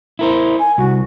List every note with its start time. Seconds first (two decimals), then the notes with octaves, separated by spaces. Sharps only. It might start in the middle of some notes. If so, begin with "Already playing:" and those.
0.19 E4 A#4 C5
0.59 G#5
0.78 C2 F#4